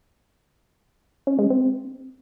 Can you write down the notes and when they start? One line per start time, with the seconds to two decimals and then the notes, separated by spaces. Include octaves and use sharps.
1.27 C#4
1.39 G#3
1.50 C4